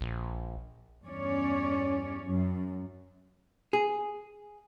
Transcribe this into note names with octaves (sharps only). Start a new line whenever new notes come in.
A#1
E2 G2 C#4 C#5 D5
F#2
G#4